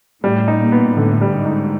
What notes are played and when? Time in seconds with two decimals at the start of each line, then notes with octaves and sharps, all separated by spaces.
0.24 A2 G3
0.48 D#4
0.60 A#2
0.72 B3
0.97 A2 D3
1.21 G3
1.33 G#2
1.46 D#4